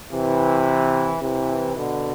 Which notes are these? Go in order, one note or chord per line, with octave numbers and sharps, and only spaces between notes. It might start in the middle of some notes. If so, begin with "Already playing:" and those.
C3 E3
C3 E3
B2 D3